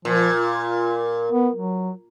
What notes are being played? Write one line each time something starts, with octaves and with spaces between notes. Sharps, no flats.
A#2 F3
F4
B3
F#3